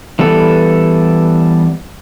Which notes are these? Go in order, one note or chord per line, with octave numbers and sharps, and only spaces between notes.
E3 G3 B3 A4